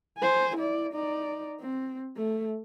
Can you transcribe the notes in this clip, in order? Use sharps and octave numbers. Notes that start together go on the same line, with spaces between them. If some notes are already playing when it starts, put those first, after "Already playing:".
C5 G#5
E4 D5
D#4 D5
C4
A3